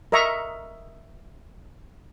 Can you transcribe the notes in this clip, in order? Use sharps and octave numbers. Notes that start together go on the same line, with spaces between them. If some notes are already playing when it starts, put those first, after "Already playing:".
A#4 D#5 E5 A#5 C#6